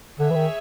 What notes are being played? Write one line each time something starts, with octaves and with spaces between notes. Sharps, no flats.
D3 G#4 C#5 E5
E3
D#3